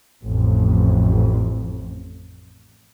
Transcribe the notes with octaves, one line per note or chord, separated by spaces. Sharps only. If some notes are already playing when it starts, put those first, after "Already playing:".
A1 F2